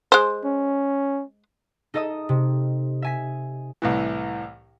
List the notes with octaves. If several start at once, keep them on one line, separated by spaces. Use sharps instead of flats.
G#3 C5
C#4
D#4 A4 D#5 E5 D#6
C3
E5 G#5 B6
C2 A2 E3